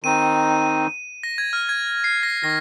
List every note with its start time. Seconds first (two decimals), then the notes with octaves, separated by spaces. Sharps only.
0.03 D#3 C4 D#4 D#7
1.23 A#6
1.38 G#6
1.53 F6
1.69 G#6
2.04 C7
2.23 A#6
2.43 D#3 A#6